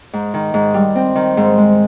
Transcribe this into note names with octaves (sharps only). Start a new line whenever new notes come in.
G#2
D#3
G#2
G3
C4
D#3
G#2
G#3